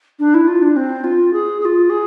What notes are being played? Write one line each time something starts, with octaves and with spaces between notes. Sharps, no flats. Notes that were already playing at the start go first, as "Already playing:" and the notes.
D4
E4
F4
D4
C4
F4
G#4
G#4
F4
G#4